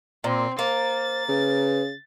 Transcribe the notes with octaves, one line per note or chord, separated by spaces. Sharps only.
A#2 C4
A#3 C5 A6
C#3 B4